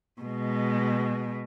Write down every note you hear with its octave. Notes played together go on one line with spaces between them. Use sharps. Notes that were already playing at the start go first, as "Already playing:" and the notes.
B2 G#3